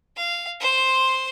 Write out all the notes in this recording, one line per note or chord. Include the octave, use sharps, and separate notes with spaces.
F5
C5 C6